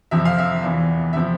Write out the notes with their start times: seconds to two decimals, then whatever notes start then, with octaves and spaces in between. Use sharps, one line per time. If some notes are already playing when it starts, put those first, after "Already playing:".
0.11 F2 C3 F3 E5
0.25 F5
0.38 E5
0.63 E2 E3
1.13 C3 F3 E5